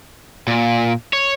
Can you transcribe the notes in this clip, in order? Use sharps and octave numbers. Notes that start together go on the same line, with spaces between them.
A#2
C#5